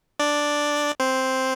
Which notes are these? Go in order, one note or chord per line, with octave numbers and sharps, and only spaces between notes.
D4 D5
C4 C5